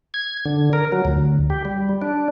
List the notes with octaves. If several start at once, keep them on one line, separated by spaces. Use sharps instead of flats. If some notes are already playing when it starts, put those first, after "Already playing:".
G#6
D3
A#4
F#3
D2
G4
G3
D4